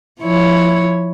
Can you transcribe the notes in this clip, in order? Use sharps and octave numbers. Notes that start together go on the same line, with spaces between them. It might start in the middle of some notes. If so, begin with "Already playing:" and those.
F3 E4 C#5